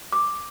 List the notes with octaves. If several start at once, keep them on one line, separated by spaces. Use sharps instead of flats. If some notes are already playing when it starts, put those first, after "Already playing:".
D6